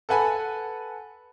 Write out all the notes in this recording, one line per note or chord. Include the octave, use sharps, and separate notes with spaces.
A4 B4 F#5 G#5 B5